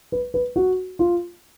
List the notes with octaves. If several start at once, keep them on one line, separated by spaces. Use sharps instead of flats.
B4
B4
F#4
F4